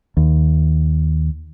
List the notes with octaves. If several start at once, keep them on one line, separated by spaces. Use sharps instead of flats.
D#2